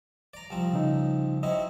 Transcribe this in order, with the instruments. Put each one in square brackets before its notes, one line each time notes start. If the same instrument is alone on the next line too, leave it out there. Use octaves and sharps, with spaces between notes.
[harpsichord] D5 A#5
C2 F3 C4
[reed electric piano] C#3 D#4
[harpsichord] F#3 C4 E4 [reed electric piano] D#5